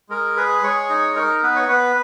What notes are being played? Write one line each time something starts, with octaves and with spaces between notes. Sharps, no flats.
G#3 A#4
G#4 B4
G#3 C#5
D#4
D#4 A#4
B3 B4
C#5
B3 B4